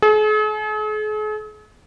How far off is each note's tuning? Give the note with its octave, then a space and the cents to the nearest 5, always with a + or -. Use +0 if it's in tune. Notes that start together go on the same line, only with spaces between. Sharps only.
G#4 +45